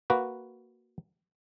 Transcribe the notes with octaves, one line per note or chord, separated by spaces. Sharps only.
A#3 F#4 B4